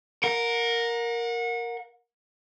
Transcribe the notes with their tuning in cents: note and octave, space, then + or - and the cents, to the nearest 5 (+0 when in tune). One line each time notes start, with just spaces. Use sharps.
A#4 +0 F#5 -35